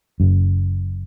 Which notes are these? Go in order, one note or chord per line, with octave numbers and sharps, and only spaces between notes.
F#1 F#2